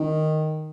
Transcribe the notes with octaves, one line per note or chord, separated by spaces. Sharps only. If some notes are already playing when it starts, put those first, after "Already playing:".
Already playing: D#3